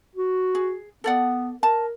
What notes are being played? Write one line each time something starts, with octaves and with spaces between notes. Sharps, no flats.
F#4
G#4
B3 A4 D5 F#5
A#4 A5